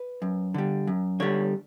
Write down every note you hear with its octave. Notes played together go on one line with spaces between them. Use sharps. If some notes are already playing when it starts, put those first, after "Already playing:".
Already playing: B4
F#2
D3 G3
F#2
D3 G3 C#5